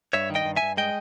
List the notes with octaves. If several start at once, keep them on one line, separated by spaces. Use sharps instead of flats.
G2 C#5 E5
D#3
D#5 G5
G2
E5 G#5
G2
G#3 D#5 G5